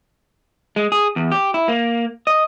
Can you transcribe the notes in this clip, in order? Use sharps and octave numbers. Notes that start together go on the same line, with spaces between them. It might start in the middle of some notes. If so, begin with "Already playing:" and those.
G#3
G#4
E2
G4
E4
A#3
D#5